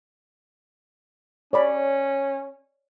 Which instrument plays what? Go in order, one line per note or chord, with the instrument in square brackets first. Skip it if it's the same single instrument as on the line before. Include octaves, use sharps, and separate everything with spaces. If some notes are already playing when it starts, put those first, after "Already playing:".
[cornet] C#4 [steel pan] C#5 D5 B5